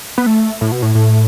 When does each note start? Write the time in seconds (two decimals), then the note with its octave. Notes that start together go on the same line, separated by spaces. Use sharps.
0.18 B3
0.26 A3
0.61 A2
0.72 B2
0.82 A2
0.95 A2